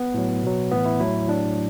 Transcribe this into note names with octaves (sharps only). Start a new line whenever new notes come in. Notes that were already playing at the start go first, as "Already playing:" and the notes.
Already playing: B3
A2 F#3
B2 F#3
A2 E3 B3
E4
A2 F#3 E4
A2 F#3 D4